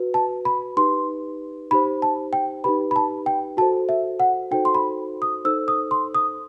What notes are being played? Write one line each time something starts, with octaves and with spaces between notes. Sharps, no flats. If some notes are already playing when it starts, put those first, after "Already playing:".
Already playing: F#4 B4
A5
B5
D#4 G4 B4 C6
D#4 G4 C5 B5
A5
G5
D#4 G4 B4 B5
B5
A5
G5
F#4 A4 C5 A5
E5
F#5
D#4 F#4 A4 C5 G5
C6
B5
D#6
D#4 A4 C5 E6
D#6
C6
D#6